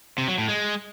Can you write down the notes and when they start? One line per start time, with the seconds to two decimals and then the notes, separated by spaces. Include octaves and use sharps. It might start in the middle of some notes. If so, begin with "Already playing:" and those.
0.18 C3
0.28 F#3
0.38 A2
0.49 G#3